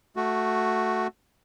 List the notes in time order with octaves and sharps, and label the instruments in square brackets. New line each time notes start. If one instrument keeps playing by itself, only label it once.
[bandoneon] A3 F#4